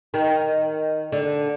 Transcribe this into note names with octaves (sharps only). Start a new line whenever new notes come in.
D#3
D3